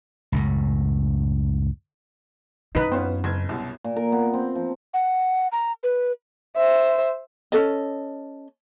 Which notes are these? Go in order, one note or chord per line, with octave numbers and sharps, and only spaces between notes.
C#2 F#2 A2
F#2 C4 D#4 B4
B3 C#4 F4 C5
F#1 G#6
C2 F#2 B2
A#2
A#4
B3
C4
F3
F#5
A#5
B4
C5 E5
C#4 D4 A4 D#5